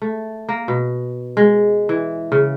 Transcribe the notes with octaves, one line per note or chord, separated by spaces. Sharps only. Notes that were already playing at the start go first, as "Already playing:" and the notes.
A3
A#3
B2
G#3
E3
C#3